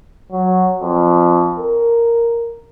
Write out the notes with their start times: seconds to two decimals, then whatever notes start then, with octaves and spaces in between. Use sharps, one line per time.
0.32 F#3
0.81 F2
1.59 A#4